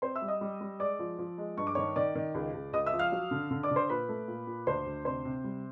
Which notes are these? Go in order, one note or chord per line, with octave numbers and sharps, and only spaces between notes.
C4 C5 C6
E5 E6
G3
D#5 D#6
G3
G3
G#3 D5 D6
F3
F3
G#3
G2 C#6
D6
D#3 C#5 C#6
D#3 D5 D6
D#3
C#2
C#2
C#2 D#5 D#6
E5 E6
F3
F5 F6
F#3
D3
D3
D5 D6
D3
C5 C6
A#2 B4 B5
A3
A#2
A#2
D2 C5 C6
D2
C3 C5 C6
C3
G3